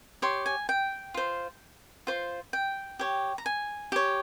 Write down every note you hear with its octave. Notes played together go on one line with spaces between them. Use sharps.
G4 C#5 C6
G#5
G5
F4 C5
F4 C5
G5
G4 C#5
A#5
G#5
G4 C#5